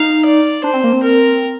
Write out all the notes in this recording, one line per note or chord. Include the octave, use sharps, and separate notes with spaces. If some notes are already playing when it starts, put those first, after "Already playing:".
Already playing: D#4 F5
D5
D4 C5
C4
A#3
C4
A#4